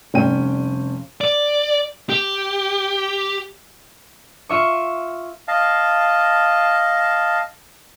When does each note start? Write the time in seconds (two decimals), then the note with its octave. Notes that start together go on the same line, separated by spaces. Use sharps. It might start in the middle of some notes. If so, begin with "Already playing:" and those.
0.14 F1 G3 C#4 G5 D#7
1.21 D5
2.09 G4
4.49 F4 E5 C#6
5.48 D#5 F5 A5